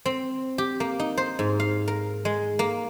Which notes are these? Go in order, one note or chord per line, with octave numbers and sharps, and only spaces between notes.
C4
G4
A#3
D#4
C5
G#2
F5
A#4
G#3
A#3